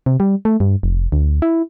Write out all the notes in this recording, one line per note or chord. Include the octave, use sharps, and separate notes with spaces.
C3
G3
A3
G2
F1
D2
E4